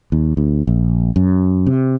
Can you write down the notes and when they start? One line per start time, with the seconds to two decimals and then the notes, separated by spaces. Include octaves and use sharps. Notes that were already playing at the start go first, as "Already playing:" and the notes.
0.12 D#2
0.37 D2
0.67 A#1
1.16 F#2
1.66 C3